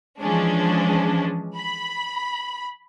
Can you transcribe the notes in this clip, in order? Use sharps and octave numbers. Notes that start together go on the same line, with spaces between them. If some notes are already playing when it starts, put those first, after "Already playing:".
E3 F3 G#3 C#4 D4
B5